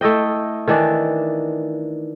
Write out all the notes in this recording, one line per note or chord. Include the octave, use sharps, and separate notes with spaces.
A3 E4 D#5 G5
D#3 E3 D4 D5